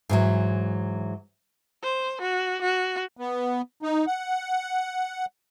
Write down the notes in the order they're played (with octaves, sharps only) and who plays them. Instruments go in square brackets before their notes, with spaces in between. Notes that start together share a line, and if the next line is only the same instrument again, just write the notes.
[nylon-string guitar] G#2 E3 F#3
[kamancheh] C5
F#4
F#4
[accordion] B3
D#4
F#5